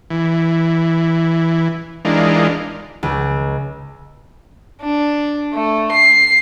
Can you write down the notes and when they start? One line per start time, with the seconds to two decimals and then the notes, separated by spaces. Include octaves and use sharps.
0.10 E3
2.05 E3 G#3 D4 D#4 F4 A#4
3.03 C#2
4.81 D4
5.53 A3
5.92 C7